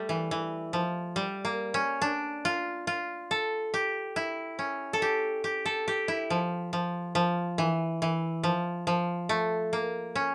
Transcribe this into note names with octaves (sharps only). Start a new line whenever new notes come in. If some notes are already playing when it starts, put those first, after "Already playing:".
Already playing: G3 A3
E3
E3
F3
G3
A#3
C#4
D4
F4
F4
A4
G4
E4
C#4
A4
G4
G4
A4
G4
E4
F3
F3
F3
E3
E3
F3
F3
A3
A#3
C#4